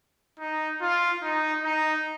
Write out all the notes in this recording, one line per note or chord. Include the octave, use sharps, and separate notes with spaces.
D#4
F4
D#4
D#4